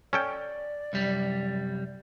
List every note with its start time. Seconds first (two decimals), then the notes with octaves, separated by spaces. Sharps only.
0.13 C#4 A4 D5 G5
0.93 C2 F#2 G3